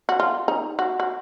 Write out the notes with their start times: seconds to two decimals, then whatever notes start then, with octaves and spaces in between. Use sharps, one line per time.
0.09 F#4
0.20 F4
0.48 D#4
0.79 F#4
1.00 F#4